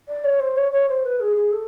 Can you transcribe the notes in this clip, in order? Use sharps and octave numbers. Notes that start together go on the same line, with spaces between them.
D5
C#5
C5
C#5
C#5
C5
B4
G#4
G#4
A4